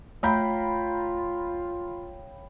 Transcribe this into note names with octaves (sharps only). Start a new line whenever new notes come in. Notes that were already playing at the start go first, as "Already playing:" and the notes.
A3 F4 C#5 F5 G5 A#5 B5 G6